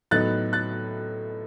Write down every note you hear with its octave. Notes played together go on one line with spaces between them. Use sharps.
A2 F#3 B3 D#4 F#6 A6
F#6 A6